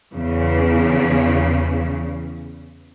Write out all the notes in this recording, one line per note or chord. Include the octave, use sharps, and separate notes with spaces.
E2 C#3